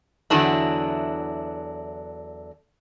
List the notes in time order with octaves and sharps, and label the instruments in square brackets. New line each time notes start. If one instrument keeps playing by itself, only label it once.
[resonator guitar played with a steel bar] E2 D3 F#3 D4 E4